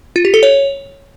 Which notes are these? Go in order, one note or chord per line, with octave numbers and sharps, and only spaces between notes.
F4
G4
A4
C#5